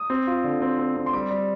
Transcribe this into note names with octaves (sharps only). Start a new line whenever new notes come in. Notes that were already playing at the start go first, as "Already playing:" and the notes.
Already playing: D#6
C4
F4
D3
C4
C4
C4
C6
G3 D6
G3